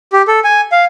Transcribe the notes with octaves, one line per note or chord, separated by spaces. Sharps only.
G4
A4
G#5
F5